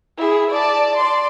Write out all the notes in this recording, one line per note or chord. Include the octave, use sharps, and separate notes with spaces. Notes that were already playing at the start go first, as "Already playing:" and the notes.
E4 G#4
D5 A5
D5 C6